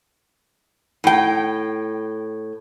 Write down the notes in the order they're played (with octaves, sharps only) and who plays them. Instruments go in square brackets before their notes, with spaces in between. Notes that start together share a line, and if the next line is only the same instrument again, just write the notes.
[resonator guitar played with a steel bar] A2 G5